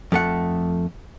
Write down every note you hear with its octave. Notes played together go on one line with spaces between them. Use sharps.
F2 A3 F#5